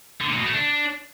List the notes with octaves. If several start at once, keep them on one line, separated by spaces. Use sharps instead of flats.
D3
A#2
B2
A3
D4